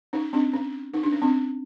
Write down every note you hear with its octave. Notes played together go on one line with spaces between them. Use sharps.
C#4 D#4
C4 D4
C#4
D#4
D4
C#4
C4 D4